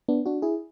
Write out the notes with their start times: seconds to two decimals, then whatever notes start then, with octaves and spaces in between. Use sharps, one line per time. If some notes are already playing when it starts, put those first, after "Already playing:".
0.08 B3 D4
0.26 D4 F#4
0.42 E4 G#4